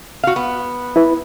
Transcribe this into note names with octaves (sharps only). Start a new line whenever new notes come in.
F#4 F5
B3
E4 B4